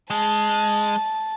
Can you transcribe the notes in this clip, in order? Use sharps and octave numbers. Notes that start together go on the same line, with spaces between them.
G#3 A5